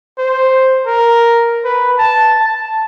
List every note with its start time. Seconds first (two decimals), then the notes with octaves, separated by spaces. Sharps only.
0.18 C5
0.87 A#4
1.65 B4
1.99 A5
2.40 A5